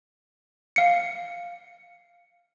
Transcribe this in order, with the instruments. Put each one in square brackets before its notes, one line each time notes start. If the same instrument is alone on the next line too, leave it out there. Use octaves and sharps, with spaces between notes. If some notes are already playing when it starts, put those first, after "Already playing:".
[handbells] F5 C#7